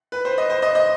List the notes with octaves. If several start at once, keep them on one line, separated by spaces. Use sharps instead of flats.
B4
C5
D#5
C5
D#5
D#5